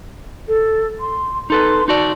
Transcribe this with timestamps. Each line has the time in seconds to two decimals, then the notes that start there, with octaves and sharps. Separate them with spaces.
0.48 A4
1.00 C6
1.50 D#4 A4 B4 C6
1.88 D#4 F#4 D5 A5